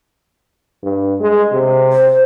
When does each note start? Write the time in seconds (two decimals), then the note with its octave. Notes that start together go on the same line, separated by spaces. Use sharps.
0.83 G2
1.21 G#3
1.52 C3
1.93 C5